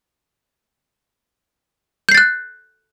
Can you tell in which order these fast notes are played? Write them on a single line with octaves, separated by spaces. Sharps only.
G6 C7 A6 F#6